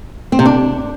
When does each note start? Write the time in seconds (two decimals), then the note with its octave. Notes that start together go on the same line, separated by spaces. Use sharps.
0.32 C4
0.39 C3
0.45 D4